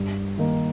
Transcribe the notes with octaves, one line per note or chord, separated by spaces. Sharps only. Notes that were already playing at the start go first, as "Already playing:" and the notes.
Already playing: G2
D#3 A#3 D#4